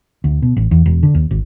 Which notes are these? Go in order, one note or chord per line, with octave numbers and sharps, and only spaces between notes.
D2
B2
A1
E2
E1
D3
D#2
G#1